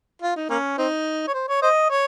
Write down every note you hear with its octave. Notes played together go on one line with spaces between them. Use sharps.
F4
D#4
A#3 C#4
C4 D#4
C#5
C5
C#5
C5 D#5
C#5